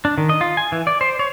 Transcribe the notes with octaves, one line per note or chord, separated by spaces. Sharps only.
D4
D#3
D#5
F4
G#5
E3
D5
C5
C#5